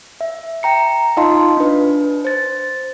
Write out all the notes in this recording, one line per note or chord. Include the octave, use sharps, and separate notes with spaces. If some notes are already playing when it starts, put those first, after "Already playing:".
E5
G5 A#5 C#7
D#4 F4 D#5 F5 A5 C6
D4 B4
C5 A6